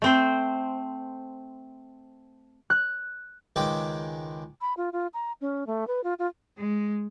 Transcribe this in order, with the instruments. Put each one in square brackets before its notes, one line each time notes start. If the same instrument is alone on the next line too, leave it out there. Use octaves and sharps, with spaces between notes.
[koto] A3 C4 C5
[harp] F#6
[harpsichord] C#2 D#3 G#3 B4 G5 D6
[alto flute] B5
F4
F4
A#5
C#4
A3
B4
F4
F4
[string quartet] G#3